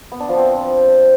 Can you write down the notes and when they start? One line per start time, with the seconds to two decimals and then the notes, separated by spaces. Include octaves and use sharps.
0.12 B3
0.20 D4
0.29 F3
0.37 C4